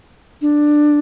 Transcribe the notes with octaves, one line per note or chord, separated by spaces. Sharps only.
D4